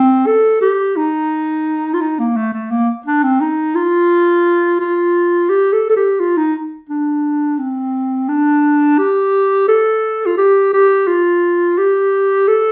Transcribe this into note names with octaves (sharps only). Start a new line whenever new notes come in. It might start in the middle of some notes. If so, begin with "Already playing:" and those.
Already playing: C4
A4
G4
D#4
F4
D#4
A#3
A3
A3
A#3
D4
C4
D#4
F4
F4
G4
A4
A4
G4
F4
D#4
D4
C4
D4
G4
A4
F4
G4
G4
F4
G4
A4